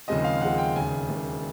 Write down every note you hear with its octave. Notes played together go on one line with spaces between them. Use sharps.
D#2 C#3 F3 G#3 C4 D#5
F5
D#2 C#3 F3 G#3 C4 F#5
G5
E1 D#2 C#3 G#5
E1 D#2 C#3